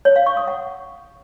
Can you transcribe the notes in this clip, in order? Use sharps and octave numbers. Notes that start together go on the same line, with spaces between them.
C#5
F5
C#6
D#6
F#5